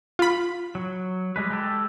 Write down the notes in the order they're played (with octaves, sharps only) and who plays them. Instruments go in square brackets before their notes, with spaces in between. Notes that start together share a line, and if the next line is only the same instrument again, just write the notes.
[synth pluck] F4 B5
[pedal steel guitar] F#3
G3 G#3 B4
G#3 G4 A4